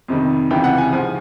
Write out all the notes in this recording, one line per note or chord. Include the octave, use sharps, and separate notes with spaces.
F2 C3 D#3 G3
C#2 C3 E3 G3 G5
F#5
G#5
G#2 F3